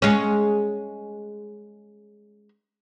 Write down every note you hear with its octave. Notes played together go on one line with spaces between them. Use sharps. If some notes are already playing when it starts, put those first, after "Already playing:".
G#3 C#4